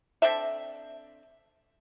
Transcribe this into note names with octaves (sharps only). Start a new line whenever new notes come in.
C4 D4 A4 E5